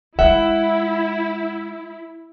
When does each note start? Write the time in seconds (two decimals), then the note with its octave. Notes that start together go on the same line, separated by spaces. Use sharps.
0.19 G#3 E4 E5 F#5